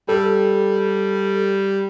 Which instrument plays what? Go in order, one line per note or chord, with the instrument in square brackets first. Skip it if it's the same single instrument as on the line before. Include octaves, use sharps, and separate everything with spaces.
[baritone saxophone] G3 [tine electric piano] A4